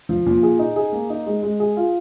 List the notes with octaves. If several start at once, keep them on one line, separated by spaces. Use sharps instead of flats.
F3
A#2
G#4
D#4
G#4
A#3
D#4
G#3
G#3
G#4
F4